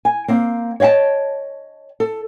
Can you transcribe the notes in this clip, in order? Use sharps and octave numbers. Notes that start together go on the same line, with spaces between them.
G#5
A#3 C4
C#5 D#5 F5 G5 A5
A4